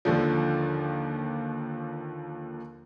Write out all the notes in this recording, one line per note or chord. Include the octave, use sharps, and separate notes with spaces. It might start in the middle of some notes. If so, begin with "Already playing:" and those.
D#2 D3 F3